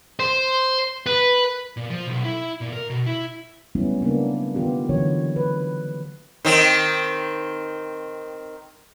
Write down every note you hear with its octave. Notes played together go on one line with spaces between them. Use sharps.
C5
B4
A#2
F3
B1
E4
A#2
A#4
B2
E4
F#3 G3 A3 B3 C#4 E4
C#3 A#3 B3 D4
D#3 B3 F4 G4
D3 E3 F#3 F4 C#5
B4
D#3 C4